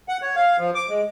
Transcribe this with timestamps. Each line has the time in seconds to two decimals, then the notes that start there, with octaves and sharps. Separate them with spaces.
0.09 F#5
0.22 C#5
0.36 F5
0.58 F3
0.75 D6
0.89 G#3